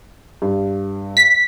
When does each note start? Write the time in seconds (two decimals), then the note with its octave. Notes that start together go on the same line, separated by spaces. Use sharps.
0.42 G2
1.17 B6